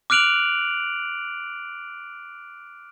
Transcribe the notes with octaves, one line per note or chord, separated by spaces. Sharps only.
D6 F6 F#6 D7 F7 F#7